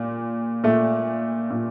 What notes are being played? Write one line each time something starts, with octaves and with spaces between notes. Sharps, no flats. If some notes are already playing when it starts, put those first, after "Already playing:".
Already playing: A#2
A#2 A3
A#2